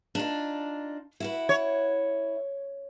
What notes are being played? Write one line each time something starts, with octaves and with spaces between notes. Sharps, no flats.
D4 D#4 F4
E4 F#4 B4
C#5